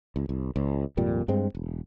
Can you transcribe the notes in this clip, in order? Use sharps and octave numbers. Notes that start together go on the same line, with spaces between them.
C#2
C2
C#2
G#1 F2 A#2 G3
G2 G#3 C4
E1